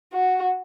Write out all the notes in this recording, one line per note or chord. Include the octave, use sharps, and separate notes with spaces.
F#4